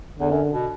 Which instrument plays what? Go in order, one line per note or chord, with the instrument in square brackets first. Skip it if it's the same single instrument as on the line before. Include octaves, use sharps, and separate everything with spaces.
[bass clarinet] E2 [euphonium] D3
[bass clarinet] F#2
B2